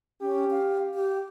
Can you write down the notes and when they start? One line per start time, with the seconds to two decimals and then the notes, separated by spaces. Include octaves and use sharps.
0.21 C#4 G4
0.51 F5
0.94 G4